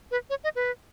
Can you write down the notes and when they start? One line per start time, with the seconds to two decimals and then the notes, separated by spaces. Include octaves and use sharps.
0.11 B4
0.30 C#5
0.44 D#5
0.56 B4